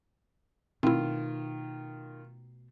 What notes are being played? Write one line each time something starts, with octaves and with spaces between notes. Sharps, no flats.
B2 D#3 A3 C4 E4 F4